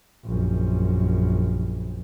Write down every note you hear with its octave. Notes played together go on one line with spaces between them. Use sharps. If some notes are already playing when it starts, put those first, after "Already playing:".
A#1 F#2